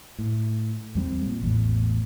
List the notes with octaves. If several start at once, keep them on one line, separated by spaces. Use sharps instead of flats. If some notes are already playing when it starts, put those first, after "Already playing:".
A2
E2 G3 C4
A#2
A1 E2 A2